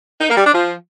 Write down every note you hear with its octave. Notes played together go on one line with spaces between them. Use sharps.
D#4
A#3
G3
D4
F3